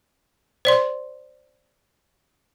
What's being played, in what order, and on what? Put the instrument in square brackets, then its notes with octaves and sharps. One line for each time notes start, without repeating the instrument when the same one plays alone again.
[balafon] C5 D5 C6